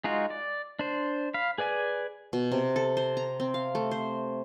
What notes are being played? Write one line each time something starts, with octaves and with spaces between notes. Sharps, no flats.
G#3 D#4 F4 F#4
D5
D4 C5
F5 B5
G#4 B4 D5 G#5
B2
C3
A4
C5
A#5
C4
F5
A3
C5